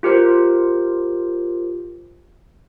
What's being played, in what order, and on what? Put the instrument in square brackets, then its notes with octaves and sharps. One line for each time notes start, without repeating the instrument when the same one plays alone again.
[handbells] F4 G4 A#4 C5